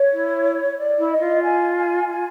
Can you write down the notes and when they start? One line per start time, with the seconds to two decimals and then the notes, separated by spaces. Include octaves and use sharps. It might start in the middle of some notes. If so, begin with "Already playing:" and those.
Already playing: C#5
0.12 E4
0.77 D5
0.99 E4
1.10 D#5
1.20 F4
1.42 G#5
1.75 G#5
2.07 G#5